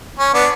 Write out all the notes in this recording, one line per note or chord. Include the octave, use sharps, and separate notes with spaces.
C#4
B3 D4